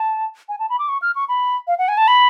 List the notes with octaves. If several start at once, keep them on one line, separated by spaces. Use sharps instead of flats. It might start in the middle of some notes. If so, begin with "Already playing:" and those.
Already playing: A5
G#5
A5
B5
D6
C#6
F6
C#6
B5
F5
F#5
G#5
A5
B5